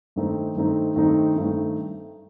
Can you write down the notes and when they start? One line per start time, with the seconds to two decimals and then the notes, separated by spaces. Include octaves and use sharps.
0.16 G2 D#3 A3 C4 D#4
0.56 G2 D#3 A3 C4 D#4
0.96 G2 D#3 A3 C4 D#4
1.36 G2 D#3 A3 C4 D#4